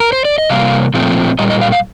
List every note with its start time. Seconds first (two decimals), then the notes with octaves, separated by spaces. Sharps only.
0.00 A#4
0.13 C5
0.25 D5
0.38 D#5
0.49 C3 G3 A#3 F5
0.94 A#2 F3 A3 C4
1.39 A#2 G3 D#5
1.50 D#5
1.61 F5
1.72 F5